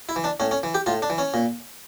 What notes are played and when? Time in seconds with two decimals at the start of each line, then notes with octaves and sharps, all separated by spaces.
0.09 E4
0.16 E3
0.24 D4
0.40 A2 C#4
0.51 C#4
0.63 E3
0.74 G4
0.86 A2 F4
1.02 D4
1.10 E3
1.18 C#4
1.34 A#2